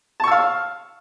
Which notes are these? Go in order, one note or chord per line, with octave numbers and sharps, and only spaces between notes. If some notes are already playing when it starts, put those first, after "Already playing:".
F5 A5 C#6 E6